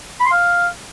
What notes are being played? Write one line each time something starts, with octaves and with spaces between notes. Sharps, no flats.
B5
C6
F5